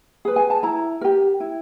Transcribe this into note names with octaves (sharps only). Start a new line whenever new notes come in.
G#4 B4
G#5
A5
E4 A#5
G4 A#4
E4